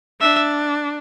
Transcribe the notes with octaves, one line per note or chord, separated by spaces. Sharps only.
D4 E5